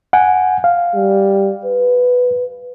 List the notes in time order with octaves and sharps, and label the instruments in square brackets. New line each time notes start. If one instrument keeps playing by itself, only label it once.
[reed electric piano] F#5 G#5
F5
[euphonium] G3
B4